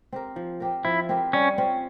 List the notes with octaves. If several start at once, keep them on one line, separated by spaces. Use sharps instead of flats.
C4 G4 A#4
F3
C4 G4 A#4
F3 E4
C4 G4 A#4
G3 C#4
C4 F4